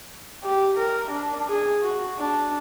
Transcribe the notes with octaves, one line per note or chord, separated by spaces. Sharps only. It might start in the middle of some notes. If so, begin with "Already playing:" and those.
G4
A#4
D4
G#4
F#4
D4